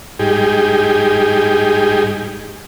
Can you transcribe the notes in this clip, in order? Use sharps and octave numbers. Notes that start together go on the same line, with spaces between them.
G#2 G3 D#4 G4 G#4